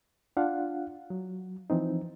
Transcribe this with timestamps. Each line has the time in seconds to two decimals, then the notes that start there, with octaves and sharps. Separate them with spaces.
0.37 D4 F4 F5 F#5
1.10 F#3
1.70 E3 F3 C4 D#4